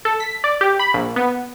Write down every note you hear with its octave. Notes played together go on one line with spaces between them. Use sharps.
A4
B6
D5
G4
B5
A#1
B3